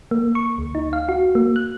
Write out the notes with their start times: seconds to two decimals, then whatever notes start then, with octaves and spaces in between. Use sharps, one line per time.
0.11 A#3
0.35 C#6
0.58 D2
0.75 D#4
0.93 F5
1.09 F#4
1.35 A#3
1.56 F#6